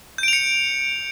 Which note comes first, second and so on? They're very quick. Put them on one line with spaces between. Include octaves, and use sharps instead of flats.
G6 D7 F7 C#7